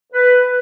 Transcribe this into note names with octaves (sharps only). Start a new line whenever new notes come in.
B4